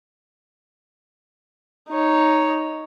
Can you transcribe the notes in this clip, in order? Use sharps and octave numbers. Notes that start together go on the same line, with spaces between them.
D#4 C#5